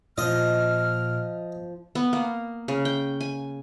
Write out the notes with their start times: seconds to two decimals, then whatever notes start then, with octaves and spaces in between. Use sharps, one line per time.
0.18 A#2 F3 F4 D#5 F6
1.95 B3
2.13 A#3
2.68 C#3
2.85 G5
3.21 G#5